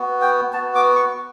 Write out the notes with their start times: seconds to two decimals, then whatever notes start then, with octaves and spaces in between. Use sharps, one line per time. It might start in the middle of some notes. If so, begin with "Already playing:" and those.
Already playing: B3 F#4
0.21 G5
0.53 B3 A5
0.57 F#4
0.75 D6
0.96 C#6